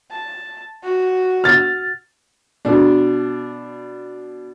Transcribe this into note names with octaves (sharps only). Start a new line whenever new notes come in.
A5
F#4
F6 A6
B2 D4